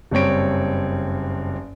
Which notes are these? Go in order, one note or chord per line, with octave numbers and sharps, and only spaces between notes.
F#1 G2 C4 C#5 D7